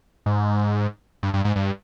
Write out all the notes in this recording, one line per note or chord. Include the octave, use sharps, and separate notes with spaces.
G#2
G2
G2
G#2
G2